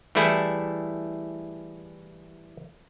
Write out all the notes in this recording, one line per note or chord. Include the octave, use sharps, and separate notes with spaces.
E3 G3 A3 E4 G#4 A4